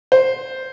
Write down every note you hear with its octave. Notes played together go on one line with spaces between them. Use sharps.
C5